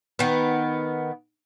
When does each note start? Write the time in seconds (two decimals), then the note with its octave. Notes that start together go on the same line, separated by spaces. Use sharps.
0.19 D#3 B3